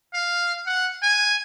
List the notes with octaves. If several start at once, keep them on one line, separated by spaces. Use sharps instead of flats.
F5
F#5
G#5